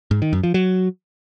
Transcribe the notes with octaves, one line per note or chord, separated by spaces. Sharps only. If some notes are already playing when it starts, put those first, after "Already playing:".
G#2
D#3
F#2
F3
F#3